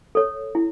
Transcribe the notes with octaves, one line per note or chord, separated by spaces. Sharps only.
A4 C#5
E4